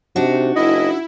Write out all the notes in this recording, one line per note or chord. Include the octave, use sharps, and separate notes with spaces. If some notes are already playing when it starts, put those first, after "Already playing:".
C3 D4 D#4 F#4
F#1 E4 D#5